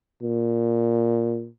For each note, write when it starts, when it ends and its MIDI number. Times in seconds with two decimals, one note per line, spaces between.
0.22 1.48 46